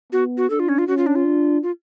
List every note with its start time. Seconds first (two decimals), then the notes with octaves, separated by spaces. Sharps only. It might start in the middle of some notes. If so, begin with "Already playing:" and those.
0.12 B3 F#4
0.37 F#4
0.50 D4 A4
0.60 F4
0.69 C#4
0.78 F4
0.88 C#4 F#4
0.97 F4
1.06 D4
1.15 F4
1.25 D4
1.63 F4